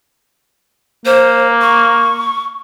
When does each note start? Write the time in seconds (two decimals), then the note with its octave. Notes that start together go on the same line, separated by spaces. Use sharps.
1.06 A#3 C5
1.61 C#6